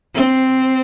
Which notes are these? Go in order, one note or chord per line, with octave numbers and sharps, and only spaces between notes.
C4